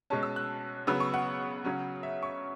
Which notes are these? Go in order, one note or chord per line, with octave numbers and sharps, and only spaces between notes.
B2 G#3 C#4 A5
E6
F#6
C#3 F#3 B3 E6
C#6
F#5
C#3 F#3 C#4
E5
C#6